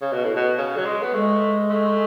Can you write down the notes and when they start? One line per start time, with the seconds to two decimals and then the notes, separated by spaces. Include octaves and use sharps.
0.01 C#3
0.13 B2
0.24 A2
0.36 B2
0.58 C#3
0.77 F#3
0.85 G#3
1.02 B3
1.14 G#3 A3
1.70 A3